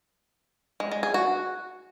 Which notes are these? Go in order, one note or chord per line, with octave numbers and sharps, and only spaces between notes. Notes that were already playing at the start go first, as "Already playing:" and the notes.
G#3
G#3
G#4
F#4